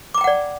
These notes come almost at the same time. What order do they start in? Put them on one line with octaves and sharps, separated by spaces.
D6 A#5 G5 F#5 D5